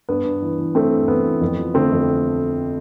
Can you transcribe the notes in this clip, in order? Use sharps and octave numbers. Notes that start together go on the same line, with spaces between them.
G2 B3
G2
E3
E3
G2 A3 C4
G2
E3 B3
E3
F2
F3
D3 A3 C4
F2